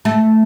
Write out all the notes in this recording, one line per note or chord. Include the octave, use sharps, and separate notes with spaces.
A3